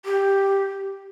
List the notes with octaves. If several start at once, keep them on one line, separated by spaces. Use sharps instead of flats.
G4